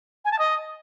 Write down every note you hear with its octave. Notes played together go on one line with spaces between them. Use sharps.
G#5
A5
D#5